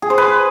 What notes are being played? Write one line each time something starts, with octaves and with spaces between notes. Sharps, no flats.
G#4
C5
B4